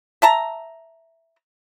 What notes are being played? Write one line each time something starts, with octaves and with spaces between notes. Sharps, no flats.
E5 A5 A#5